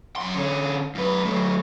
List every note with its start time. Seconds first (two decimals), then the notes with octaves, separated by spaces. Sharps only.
0.16 F#2 C6
0.35 D3 C#4
0.95 F#2 B4
1.25 F#3 A3